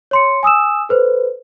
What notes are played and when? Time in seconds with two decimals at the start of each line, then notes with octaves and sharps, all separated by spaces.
0.11 C#5 C6 C#7
0.43 G#5 D#6 E6 E7
0.89 A4 B4 C5